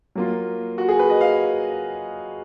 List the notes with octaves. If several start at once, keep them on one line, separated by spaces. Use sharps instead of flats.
F#3 A#3 F4
F#4
G#4
B4
D#5
F5